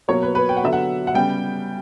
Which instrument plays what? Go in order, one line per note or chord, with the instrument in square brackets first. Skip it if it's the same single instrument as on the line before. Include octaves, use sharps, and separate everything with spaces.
[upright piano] B2 F#3 A#3 C#5
B4
B4
G5
F#5
D3 F#3 B3 E5
F#5
F#5
C#3 G3 B3 G5